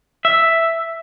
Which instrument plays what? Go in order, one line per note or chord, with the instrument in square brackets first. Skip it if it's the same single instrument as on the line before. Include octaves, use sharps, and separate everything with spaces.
[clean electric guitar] E5